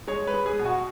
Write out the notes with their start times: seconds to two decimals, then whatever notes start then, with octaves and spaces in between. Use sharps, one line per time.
0.08 G#3 C#5
0.27 B4
0.34 G#3
0.46 G#4
0.59 B2
0.65 F#4